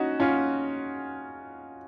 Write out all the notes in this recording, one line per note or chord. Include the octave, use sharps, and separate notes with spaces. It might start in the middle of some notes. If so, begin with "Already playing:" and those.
Already playing: C#4 D#4 F#4
C#4 F4